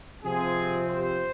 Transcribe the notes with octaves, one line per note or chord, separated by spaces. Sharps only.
C3 F3 C4 G#4
C5